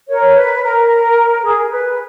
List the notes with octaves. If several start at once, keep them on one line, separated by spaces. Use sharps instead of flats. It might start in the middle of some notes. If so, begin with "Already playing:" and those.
A#4 C#5
B4
A#4
G#4
B4